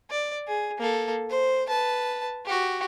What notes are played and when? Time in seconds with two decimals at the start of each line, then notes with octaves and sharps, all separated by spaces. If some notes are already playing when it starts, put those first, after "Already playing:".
0.11 D5
0.48 G#4
0.79 A#3 A4
1.30 C5
1.67 B4 A5
2.45 F#4 G4